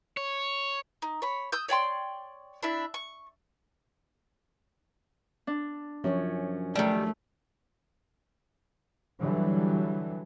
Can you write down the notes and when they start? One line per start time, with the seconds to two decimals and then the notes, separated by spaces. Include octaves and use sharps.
0.17 C#5
1.02 D#4
1.22 C#5 B5
1.52 D#6 E6 G6
1.69 C#5 D5 G5 C6
2.63 D4 E4 E5
2.94 C#6
5.47 D4
6.04 F#2 F3 C#4 C#5
6.75 D#3 G3 A3
9.20 D3 E3 F#3 G3